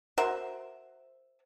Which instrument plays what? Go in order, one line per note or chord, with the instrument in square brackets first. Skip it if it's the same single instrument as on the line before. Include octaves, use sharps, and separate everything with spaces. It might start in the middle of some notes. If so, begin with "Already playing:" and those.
[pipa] F#4 A#4 C5 E5